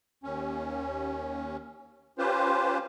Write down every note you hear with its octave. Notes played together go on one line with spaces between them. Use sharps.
D#2 C#4
C#4 F4 G4 B4 C5